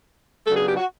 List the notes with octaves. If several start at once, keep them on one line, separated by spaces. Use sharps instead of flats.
C#3 F#3 B3 D4 A4
G#4
G4
F#4